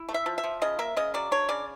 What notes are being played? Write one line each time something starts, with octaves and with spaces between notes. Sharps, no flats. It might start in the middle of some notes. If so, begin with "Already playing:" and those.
Already playing: E4
A3
E5
F3
E5
F3
C#3 D#5
A#3 E5
C#3 D#5
F#3 D5
D4 C#5
C#3 D5